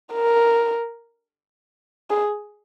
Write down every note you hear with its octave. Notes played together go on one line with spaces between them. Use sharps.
A#4
G#4